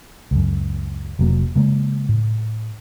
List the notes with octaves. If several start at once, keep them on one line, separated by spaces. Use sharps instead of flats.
C#2 F#2
F1 F#3 A#3
C#3 G#3 A#3
A2